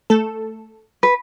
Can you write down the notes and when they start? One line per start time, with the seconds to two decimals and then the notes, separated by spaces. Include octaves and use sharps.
0.10 A3 A4
1.03 B4